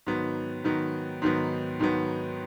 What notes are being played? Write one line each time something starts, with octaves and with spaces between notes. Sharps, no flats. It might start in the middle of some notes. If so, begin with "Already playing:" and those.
G#2 D#3 F#3 B3
G#2 D#3 F#3 B3
G#2 D#3 F#3 B3
G#2 D#3 F#3 B3